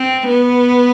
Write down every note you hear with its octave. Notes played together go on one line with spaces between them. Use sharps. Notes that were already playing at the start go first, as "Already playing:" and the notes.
Already playing: C4
B3